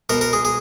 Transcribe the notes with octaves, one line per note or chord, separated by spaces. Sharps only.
B2 A#4
A#4
G#4
G#4